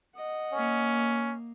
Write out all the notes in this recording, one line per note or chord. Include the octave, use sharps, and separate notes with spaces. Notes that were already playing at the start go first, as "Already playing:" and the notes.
D#5 F#5
A#3 C#4